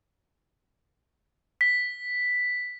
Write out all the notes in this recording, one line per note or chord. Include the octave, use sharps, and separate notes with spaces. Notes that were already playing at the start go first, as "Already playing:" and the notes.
B6